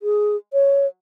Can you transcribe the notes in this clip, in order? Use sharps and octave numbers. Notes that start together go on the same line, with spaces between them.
G#4
C#5